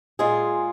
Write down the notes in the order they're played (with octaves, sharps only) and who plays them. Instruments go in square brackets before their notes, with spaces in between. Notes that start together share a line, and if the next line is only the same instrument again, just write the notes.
[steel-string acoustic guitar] A#2 G#3 F4 G#4